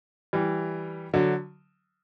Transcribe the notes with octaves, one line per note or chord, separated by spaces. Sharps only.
E3 G3
D3 F#3